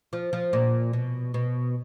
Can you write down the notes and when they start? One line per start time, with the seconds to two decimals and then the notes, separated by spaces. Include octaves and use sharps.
0.13 F3
0.33 F3
0.53 A#2
0.93 B2
1.34 B2